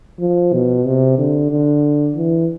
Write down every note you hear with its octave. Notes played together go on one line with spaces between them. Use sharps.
F3
B2
C3
D3
D3
E3